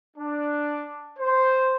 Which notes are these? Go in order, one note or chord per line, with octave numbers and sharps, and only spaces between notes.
D4
C5